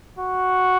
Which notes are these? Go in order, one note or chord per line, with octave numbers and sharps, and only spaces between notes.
F#4